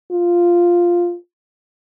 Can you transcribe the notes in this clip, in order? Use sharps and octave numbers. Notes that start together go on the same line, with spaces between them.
F4